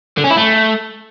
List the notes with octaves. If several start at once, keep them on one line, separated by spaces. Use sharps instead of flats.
D3
C#4
E4
A3